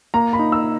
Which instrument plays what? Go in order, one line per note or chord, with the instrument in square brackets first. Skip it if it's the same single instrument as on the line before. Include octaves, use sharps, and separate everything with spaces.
[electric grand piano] A#3 [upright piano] A#5
[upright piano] B5
[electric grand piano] D#4
[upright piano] E6